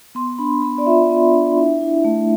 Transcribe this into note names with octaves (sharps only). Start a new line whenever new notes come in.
B3 C6
D4 B5
B3 B5
D5
F4 E5
B3
D4
E4
E4
A3